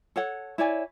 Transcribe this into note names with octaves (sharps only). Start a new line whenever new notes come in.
A4 C#5 F#5
E4 C#5 D5 G#5